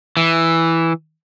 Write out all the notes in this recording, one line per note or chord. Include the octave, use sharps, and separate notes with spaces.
E3